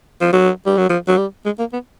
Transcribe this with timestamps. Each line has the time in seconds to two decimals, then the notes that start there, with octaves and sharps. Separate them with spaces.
0.21 F3
0.33 F#3
0.66 G3
0.78 F#3
0.89 F3
1.08 F#3
1.18 G3
1.45 G#3
1.59 A#3
1.73 B3